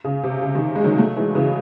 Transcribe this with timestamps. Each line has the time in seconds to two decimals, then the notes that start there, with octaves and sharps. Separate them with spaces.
0.04 C#3
0.23 C3
0.42 C#3
0.55 C3 D#3
0.76 G#3
0.84 D#3 F#3
0.98 F#3 A3
1.17 E3 G#3
1.35 C#3 E3